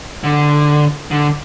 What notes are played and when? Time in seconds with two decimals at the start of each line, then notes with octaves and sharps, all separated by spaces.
0.24 D3
1.11 D3